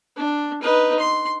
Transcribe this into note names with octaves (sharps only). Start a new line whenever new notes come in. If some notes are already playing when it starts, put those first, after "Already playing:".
D4
D#4 B4
C6